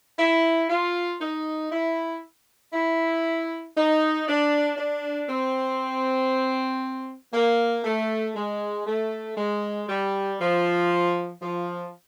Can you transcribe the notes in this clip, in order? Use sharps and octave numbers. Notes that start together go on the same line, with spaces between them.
E4
F4
D#4
E4
E4
D#4
D4
D4
C4
A#3
A3
G#3
A3
G#3
G3
F3
F3